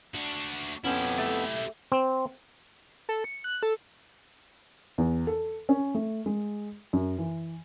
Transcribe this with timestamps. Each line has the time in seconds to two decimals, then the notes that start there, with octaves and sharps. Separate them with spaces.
0.14 D4 F#4
0.84 F2 B3 C#4 E4 G4
1.18 A3
1.92 C4
3.09 A4
3.24 C#7
3.44 F#6
3.63 A4
4.98 E2
5.27 A4
5.69 C#4
5.95 A3
6.26 G#3
6.93 F#2
7.19 E3